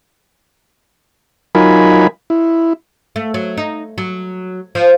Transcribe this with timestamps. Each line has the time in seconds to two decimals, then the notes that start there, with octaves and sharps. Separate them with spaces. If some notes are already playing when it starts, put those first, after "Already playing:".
1.55 F#3 D#4 F4 A#4 G#5 B5
2.30 E4
3.16 A3
3.34 F#3
3.57 D#4
3.98 F#3
4.75 F3